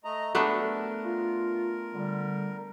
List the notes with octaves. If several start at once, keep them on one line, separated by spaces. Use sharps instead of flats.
A3 D#5 A#5
A3 B3 D4 A#4
F4
D3 G3